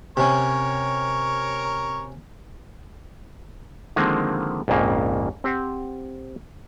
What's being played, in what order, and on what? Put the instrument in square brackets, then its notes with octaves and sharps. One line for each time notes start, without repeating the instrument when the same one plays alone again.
[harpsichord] C3 C#4 [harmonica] A#4 C#5
[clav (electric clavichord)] D3 D#3 F3 G#3 A#3 C4
A#1 F2 G#2 C#3 A#3
C4 G4 C5 F#5